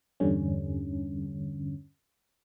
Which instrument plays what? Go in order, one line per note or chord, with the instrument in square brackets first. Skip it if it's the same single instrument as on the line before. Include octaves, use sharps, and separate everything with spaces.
[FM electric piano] E2 G2 D3 G3 C#4